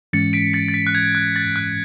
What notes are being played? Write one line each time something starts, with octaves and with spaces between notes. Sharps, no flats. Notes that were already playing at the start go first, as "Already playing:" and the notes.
G#2 E3 G#3 C#4 A6 C#7
B6 D7
A6 C#7
A6
B6
F#6
G#6
F#6
A6
F#6